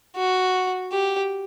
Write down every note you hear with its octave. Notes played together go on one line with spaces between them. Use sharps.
F#4
G4